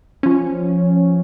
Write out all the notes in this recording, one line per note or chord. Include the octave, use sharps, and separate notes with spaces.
F3 C#4